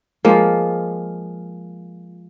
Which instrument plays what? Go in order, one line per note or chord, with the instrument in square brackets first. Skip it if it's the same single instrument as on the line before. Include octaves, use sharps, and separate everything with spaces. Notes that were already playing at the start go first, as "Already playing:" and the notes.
[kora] F3 G#3 A#3 F4